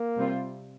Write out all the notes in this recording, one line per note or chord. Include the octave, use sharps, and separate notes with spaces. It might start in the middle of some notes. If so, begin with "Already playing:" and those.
Already playing: A#3
C3 G3 C4 F4